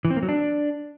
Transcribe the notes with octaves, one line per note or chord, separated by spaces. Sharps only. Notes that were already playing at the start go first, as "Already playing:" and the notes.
E3
C4
A#3
F#3
D4